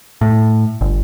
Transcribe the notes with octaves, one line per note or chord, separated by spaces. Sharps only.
A2
G1